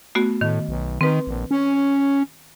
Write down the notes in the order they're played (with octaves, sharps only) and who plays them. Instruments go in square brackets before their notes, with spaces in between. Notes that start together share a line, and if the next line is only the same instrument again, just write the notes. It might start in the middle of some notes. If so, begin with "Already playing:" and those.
[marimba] A3 B3 F#4
[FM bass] A2 [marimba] D#3
[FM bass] B1
[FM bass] D#3 [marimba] C4 B4
[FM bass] A#1
C#4